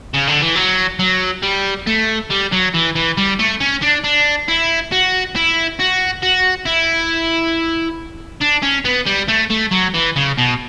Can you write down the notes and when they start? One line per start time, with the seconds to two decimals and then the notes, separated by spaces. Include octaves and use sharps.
0.14 C#3
0.28 D3
0.42 E3
0.55 F#3
0.99 F#3
1.42 G3
1.87 A3
2.30 G3
2.52 F#3
2.74 E3
2.95 E3
3.18 G3
3.39 A3
3.61 C#4
3.83 D4
4.04 D4
4.48 E4
4.92 F#4
5.36 E4
5.80 F#4
6.23 F#4
6.66 E4
8.41 D4
8.63 C#4
8.85 B3
9.06 G3
9.29 A3
9.50 A3
9.72 F#3
9.94 E3
10.16 C#3
10.38 B2